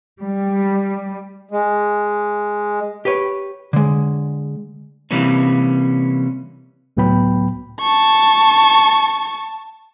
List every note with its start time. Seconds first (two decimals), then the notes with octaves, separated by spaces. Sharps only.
0.24 G3
1.51 G#3
3.05 G4 B4 C#5
3.73 D3 G#3
5.11 C3 E3 G3 A#3 C#4
6.97 C#2 A2 F#3 B3 G5 B5
7.81 A5 C#6